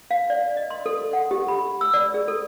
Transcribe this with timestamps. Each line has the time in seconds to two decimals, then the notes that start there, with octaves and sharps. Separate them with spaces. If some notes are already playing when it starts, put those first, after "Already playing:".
0.11 F5
0.30 D5
0.57 D#5
0.70 C6
0.86 A4
1.13 F#5
1.31 G4
1.48 B5
1.81 E6
1.94 D5
2.14 G#4
2.28 A4